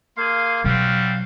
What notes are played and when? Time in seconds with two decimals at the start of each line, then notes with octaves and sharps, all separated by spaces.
0.17 A#3 G#4 F5 C6
0.64 B2 F#3 G3 C4 F#4 F5